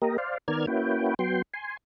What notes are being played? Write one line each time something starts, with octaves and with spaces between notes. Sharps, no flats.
A#3 G4 A#4 D#5
C5 D5 F5
D#3 B3 A#4 D5 F6 G#6
A#3 C#4 E4 F#4 B4 G5
F#3 B3 G5 C6
G#5 C6